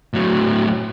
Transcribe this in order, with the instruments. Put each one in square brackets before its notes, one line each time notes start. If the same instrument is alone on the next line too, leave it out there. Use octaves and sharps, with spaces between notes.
[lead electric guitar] A2 F#3